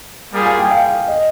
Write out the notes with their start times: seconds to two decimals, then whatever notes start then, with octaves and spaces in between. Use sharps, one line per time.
0.34 G3 A#3 F4 G#4
0.46 G#5
0.59 G5
0.71 F5
1.08 D#5